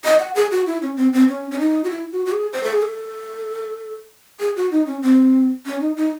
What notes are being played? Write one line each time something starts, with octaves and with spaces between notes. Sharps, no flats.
D#5
F#5
G#4
F#4
E4
C#4
C4
C4
C#4
C#4
D#4
F#4
E4
F#4
F#4
G#4
C5
A4
G#4
A4
G#4
F#4
D#4
C#4
C4
C#4
D#4
D#4